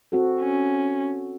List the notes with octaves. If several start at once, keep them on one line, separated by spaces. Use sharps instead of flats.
C4 F#4 A4
C#4